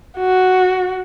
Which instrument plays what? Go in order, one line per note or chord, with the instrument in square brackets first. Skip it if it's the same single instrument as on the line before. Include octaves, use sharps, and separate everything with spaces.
[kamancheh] F#4